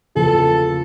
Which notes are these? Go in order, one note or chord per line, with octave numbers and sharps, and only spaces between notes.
E2 C#3 F3 A#3 A4